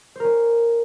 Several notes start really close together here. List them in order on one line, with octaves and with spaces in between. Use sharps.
C5 A#4 C#4